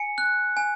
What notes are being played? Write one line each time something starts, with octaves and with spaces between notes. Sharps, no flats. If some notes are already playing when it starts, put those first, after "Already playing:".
Already playing: G#5 C#7
F#6
G#5